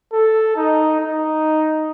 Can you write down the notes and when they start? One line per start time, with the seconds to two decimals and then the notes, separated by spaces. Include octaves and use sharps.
0.13 A4
0.57 D#4
1.00 D#4